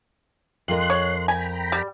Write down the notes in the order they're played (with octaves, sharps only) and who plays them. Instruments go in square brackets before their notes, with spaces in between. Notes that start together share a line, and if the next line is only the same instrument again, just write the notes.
[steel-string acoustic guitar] F2 A#4 D#5 [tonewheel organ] C6 F#6
[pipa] C#5
[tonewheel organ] G5 A#5 B5 [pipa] G#5
[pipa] G3